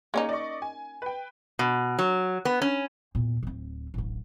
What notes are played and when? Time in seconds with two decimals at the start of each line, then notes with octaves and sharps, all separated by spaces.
0.14 A#3 C#4 D#4 G#4 C#5
0.29 D5 D#5 C#6
0.62 G#5
1.02 B4 G5
1.59 B2
1.99 F#3
2.45 B3
2.62 C#4
3.15 E2 A#2
3.43 D1 C4
3.94 D1 A1